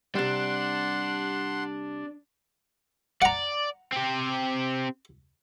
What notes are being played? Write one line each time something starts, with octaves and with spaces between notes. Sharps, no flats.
C3 G3 D4 F#5 C6
D5 F#5 A#5
C4 G4